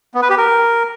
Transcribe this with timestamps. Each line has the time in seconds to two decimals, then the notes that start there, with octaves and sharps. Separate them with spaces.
0.14 B3
0.22 B4
0.30 G4
0.37 A#4